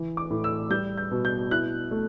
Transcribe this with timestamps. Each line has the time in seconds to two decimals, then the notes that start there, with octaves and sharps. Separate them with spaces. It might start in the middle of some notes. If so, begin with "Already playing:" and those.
Already playing: E3
0.17 D6
0.30 A2
0.44 E6
0.70 G3 G6
0.97 G6
1.11 B2
1.25 G6
1.51 E4 F#6
1.91 A3